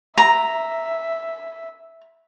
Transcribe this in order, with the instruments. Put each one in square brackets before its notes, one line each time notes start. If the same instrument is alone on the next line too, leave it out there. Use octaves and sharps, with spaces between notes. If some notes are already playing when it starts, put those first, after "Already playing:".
[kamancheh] E5 [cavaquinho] A#5